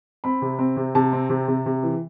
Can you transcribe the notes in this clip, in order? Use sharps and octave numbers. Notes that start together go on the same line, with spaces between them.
C4 B5
C3
C4
C3
C3 A5
C4
C3
C3
C3
E3